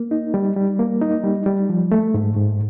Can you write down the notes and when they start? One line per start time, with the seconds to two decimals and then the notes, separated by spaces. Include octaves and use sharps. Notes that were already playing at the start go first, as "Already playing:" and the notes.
Already playing: A#3
0.11 D#4
0.34 G3
0.56 G3
0.79 A#3
1.01 D#4
1.24 G3
1.46 G3
1.69 F3
1.92 A3
2.14 G#2
2.37 G#2